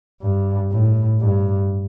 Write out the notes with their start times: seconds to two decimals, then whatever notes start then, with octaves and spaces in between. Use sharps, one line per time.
0.22 G2
0.71 A2
1.20 G2